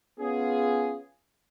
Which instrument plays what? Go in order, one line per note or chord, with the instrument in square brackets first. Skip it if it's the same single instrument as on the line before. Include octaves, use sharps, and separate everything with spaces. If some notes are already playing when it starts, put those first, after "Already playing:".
[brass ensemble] B3 C#4 F4 G#4